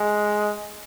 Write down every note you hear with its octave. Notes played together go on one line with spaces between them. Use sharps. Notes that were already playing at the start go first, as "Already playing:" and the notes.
Already playing: G#3